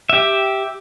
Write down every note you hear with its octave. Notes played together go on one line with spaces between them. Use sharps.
G4 E5